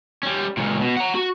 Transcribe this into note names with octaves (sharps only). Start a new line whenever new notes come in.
G3 C#4
C#2 A#2
B2
F#5 A#5
F#4